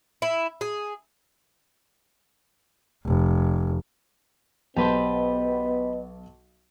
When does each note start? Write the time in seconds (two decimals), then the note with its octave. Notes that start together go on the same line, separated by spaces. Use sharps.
0.22 E4
0.61 G#4
3.06 F1
4.77 B1 B3 G4 B4 C5 D#5 A5